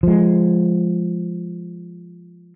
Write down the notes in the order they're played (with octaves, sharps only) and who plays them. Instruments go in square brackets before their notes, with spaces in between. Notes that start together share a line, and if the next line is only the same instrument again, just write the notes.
[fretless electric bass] F3 G#3